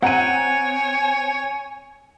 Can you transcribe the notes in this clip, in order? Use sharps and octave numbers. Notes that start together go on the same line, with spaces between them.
C4 C#5 F#5 G#5 A#5 D#7